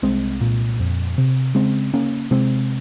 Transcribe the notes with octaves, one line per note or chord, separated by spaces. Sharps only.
C2 G#3 C4
A#2
F2
C3
C#3 G#3 C4
C#3 A#3 C#4
C3 G#3 C4